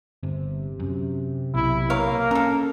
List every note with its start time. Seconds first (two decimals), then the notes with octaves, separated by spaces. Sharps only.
0.23 G1 C3
0.80 F#2
1.54 B1 E4
1.90 A#3 A#4 C#5 F5
2.31 C#4 A4 A#4